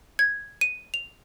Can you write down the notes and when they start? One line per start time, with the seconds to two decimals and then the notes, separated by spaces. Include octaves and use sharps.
0.19 G#6
0.61 D#7
0.94 F7